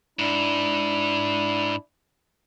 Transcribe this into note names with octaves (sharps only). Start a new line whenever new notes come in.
G#2 D4 E4